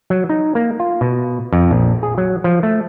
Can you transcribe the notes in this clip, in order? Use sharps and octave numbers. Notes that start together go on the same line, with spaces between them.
F#3
D#4
A#3
F4
B2
F2
A#1
G#4
F#3
F3
A3